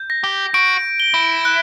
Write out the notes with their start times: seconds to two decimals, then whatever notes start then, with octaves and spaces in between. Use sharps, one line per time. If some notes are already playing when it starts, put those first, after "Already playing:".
Already playing: G6
0.10 A#6
0.24 G4
0.54 F#4 D7
1.00 G7
1.14 E4
1.45 F#6